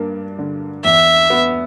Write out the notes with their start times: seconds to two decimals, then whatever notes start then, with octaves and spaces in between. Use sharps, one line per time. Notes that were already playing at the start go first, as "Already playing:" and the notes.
Already playing: G2 A#3 D4
0.39 D3
0.84 E2 E5
1.30 B3